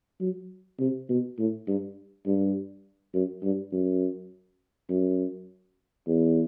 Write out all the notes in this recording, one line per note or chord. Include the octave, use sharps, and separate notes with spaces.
F#3
C3
B2
A2
G2
G2
F#2
G2
F#2
F#2
E2